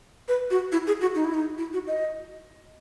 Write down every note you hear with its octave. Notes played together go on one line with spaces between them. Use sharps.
B4
F#4
E4
G#4
F#4
D#4
E4
D#4
E4
F#4
D#5